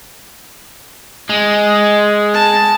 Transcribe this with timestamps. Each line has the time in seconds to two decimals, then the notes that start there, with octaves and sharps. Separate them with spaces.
1.30 G#3
2.34 A5